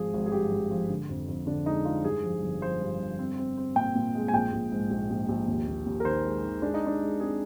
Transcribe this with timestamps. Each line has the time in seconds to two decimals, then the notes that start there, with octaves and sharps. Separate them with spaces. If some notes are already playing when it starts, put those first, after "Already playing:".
Already playing: G#1 F3 G#4
0.13 G#1
0.26 G#4
0.32 G2 G4
0.52 G2
0.71 F3
0.89 D3
1.09 F2
1.28 F2
1.47 D3 D4
1.66 G#3 D#4
1.85 G#3 F4
2.04 G2 G#4
2.23 F3
2.42 G1
2.61 F3 C5
2.81 G2
3.00 G1
3.19 C4
3.38 C4
3.57 C4
3.76 A#2 G5
3.95 A#2
4.15 G#3
4.28 G#5
4.33 A#1 G5
4.52 A#1
4.72 G#2
4.90 A#1
5.10 A#1
5.29 A#1
5.48 D#2
5.67 D#2
5.86 D#2
6.00 A#4
6.05 D#3 C5
6.24 G#3
6.44 D#3
6.62 G#3 D4
6.74 D#4
6.82 G#3 D4
7.01 G#3
7.20 C4 G#4